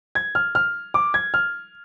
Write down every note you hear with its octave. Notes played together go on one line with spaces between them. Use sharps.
G#6
F6
F6
D6
G#6
F6